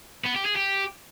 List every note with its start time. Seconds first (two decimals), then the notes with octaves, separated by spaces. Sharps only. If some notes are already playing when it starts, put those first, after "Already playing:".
0.24 B3
0.35 G4
0.45 G#4
0.56 G4